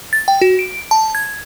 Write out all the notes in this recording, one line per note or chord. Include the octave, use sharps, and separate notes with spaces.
A6
G5
F#4
D7
A5
G#6